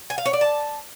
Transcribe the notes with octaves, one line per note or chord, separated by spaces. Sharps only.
G#5
F5
C#5
D5
A5